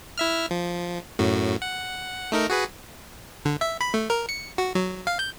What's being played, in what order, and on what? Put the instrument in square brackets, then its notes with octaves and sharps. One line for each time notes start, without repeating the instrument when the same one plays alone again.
[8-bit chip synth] E4 E5 F6
F3
F#2 A2 F#3
F#5
A3 D#4 A#4
F#4 G#4 B4
D3
E5
B5
A3
A#4
C#7
F#4
F#3
F5
G6